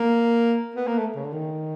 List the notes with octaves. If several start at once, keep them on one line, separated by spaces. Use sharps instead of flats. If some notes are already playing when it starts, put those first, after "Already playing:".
Already playing: A#3
B3
A#3
A3
C#3
D3
D#3